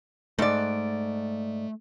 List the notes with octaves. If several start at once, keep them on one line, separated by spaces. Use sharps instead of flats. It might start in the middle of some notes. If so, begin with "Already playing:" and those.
G#2 A3 D5